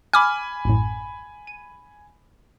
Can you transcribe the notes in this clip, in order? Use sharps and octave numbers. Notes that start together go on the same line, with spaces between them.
G#5 B5 D6 F6
A1 F#2 A2
D#7